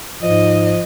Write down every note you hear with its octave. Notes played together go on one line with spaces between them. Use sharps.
G#2 F3 D#5